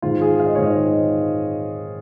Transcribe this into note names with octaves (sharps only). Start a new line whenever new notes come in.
G#2 D#3 G#3 F4
G#4
F5
D#5
C#5
G#2 D#3 G#3 D#5